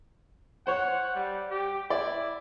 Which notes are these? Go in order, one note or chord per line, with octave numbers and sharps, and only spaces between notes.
C5 C#5 F#5
G3
G4
E4 D5